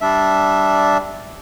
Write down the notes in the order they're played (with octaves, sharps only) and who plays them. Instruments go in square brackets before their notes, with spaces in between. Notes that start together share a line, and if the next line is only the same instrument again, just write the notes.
[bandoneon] G3 D4 E5